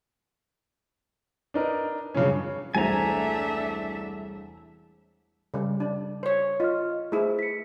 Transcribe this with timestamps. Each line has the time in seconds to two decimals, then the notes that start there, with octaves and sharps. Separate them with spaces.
1.54 D4 D#4 A#4 B4
2.14 G2 C#3 F3 F#3 C#4
2.75 E1 C2 A3 D4 C5 E5 G#5 A#5
5.54 C#3 G3
5.80 D4
6.23 C5 C#5
6.60 F4 D#5 F6
7.12 A3 E4 G#4 C5
7.39 B6 C#7